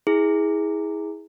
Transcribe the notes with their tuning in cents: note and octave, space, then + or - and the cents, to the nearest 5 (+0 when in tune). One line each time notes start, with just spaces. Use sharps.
E4 -25 G#4 -5